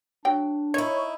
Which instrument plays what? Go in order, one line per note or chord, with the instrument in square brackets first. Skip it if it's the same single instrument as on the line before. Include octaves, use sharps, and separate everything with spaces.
[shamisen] F#3 G5 [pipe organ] D4
[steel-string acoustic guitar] D#4 E4 [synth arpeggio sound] C#5